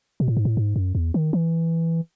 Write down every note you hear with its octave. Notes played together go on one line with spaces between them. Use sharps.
B2
A2
G#2
A2
G#2
F#2
E2
D#3
E3